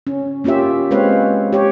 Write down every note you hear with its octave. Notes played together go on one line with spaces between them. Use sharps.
C#4
A#3 C#4 F4 G4 E5
G#3 C4 B4 C#5 F5
G4 C#5